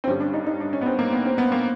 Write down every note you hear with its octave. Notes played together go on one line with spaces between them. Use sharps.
C4
G2 D3 G3 C#4
D4
D#4
D#4
D4
C#4
B3
C4
A#3
B3
C4
B3
A#3